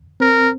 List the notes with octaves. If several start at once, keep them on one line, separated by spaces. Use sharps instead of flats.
C4 A#4